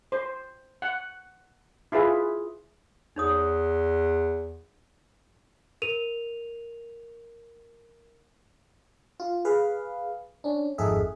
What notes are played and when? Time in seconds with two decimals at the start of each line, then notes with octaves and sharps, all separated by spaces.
0.12 C5
0.82 F#5
1.92 E4 F4 G#4 B4 E5
3.16 E2 D#4 C#5 D#6
5.82 A#4 D#7 F7
9.20 F4
9.45 G#4 B4 F5
10.44 C#4 D4
10.78 G#1 F2 D#4 G#4 A4 E5